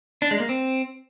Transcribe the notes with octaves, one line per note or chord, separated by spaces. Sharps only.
D4
G#3
A#3
C4